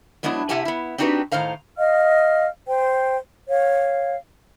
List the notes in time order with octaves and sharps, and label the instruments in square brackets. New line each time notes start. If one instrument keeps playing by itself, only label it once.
[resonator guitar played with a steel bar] F#3 G#3 B3 C#4 D4 E4
C3 E4 G4 F#5 G#5 A5
B3 E4
C4 D4 D#4 F#4 G4 B4
A2 D#3 C5 F5 A#5
[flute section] D#5 F5 F6
C5 G5
C#5 F5